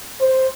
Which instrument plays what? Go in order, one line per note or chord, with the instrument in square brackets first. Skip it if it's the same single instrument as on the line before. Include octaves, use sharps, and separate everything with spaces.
[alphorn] C5